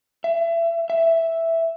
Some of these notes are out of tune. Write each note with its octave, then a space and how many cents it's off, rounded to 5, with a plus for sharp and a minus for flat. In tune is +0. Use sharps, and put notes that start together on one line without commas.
E5 +30
E5 +0